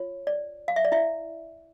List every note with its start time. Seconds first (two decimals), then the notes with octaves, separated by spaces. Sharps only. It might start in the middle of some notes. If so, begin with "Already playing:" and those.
Already playing: F4 C#5
0.27 D5
0.68 F5
0.76 E5
0.85 D5
0.92 E4 E5